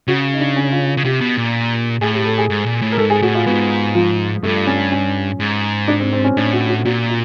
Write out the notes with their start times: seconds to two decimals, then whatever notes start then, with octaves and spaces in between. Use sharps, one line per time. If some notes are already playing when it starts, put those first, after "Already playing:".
0.08 C#3 F#4
0.33 D#4
0.40 D4
0.56 C#4
0.72 F4
0.97 C#3
1.05 C3 G4
1.21 B2
1.37 A#2
2.01 A2 G#4
2.14 G4
2.25 A4
2.38 G#4
2.50 G#2
2.66 A#2
2.82 A2
2.92 A#4
2.98 G#2 A4
3.10 G#4
3.22 A2 F#4
3.35 F4
3.46 G#2 B3
3.95 F3
4.43 G2 A3
4.67 C#4
4.92 C#4
5.40 G#2
5.88 D4
6.00 C4
6.12 C4
6.24 C#4
6.37 A2 D4
6.53 F#4
6.69 F#4
6.85 A#2 F#4
7.09 F4